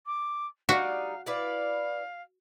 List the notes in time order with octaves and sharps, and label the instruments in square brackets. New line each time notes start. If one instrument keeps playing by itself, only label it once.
[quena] D6
[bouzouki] G3 D#4 [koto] F#4 [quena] F5
[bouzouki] E4 B4 D5 [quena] F5